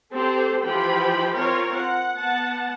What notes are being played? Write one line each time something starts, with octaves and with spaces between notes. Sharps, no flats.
C4 G4 A4 C5
E3 F3 G4 G5 B5
C4 F4 A#4 C#5
F#5
B3 F#5 A5